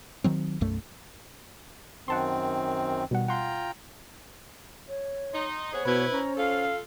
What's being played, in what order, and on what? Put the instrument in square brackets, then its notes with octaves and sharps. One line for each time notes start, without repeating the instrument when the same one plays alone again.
[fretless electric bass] D#3 F#3 C4
B1 F#2 A3
[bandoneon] F#2 D#3 C4 [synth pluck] F#5 A5 C6
[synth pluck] B2 G3 F#5 [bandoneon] D#3
[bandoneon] F4 G5 A#5 [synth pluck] F#5 C6
[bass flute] C#5
[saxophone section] D#4 [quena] C6
[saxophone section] B3 G#4 [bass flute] C5 [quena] C#5
[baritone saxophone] B2 [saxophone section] E4 B4
[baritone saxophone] C#4 [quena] A#5
[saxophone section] F4 A4 [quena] F5